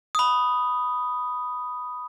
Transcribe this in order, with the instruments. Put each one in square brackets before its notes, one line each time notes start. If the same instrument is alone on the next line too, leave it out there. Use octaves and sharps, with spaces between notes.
[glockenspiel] B5 D#6